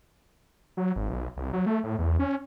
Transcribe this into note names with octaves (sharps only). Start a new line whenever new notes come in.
F#3
G#1
B1
C2
F#3
A3
A2
E2
C#4